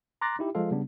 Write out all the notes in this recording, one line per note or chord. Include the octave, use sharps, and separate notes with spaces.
A#5 C6 D6 F#6 A6 A#6
D#4 E4 G4
F3 G#3 F4 A4 F5
C#3 G3 B3 D4